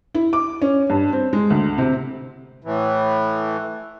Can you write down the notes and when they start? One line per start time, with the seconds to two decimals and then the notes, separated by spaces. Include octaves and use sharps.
0.15 E4
0.33 D6
0.62 C#4
0.90 G2
1.13 C4
1.33 G#3
1.50 D2
1.78 C3
2.62 A2 E3